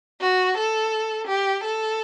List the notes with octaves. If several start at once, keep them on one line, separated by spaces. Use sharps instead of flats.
F#4
A4
G4
A4